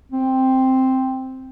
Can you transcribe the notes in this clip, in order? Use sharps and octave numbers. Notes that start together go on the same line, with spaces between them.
C4